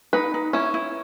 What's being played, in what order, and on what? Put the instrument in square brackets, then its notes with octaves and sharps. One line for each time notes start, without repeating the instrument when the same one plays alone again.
[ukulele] D#4 [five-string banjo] B4
[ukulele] D#4
[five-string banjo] C#4 [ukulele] E4
[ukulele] E4